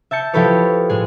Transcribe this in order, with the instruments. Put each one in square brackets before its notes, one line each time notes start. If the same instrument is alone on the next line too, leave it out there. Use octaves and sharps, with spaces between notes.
[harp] E5 A5 G6 C#7
F3 E4 G4 A4 B4 C#5
A2 G#3 G#4